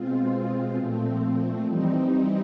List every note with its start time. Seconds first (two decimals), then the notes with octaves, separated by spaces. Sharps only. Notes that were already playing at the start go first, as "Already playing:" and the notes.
Already playing: B2 G#3 C4 F4
0.77 A#2 F3 A3 C4
1.65 E3 G3 C4 D#4